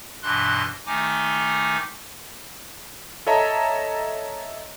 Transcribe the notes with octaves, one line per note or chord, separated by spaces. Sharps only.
G2 B2 E3 C6 F#6
D#3 A3 D#4 G#5 D6
A4 C#5 D#5 E5 A5 A#5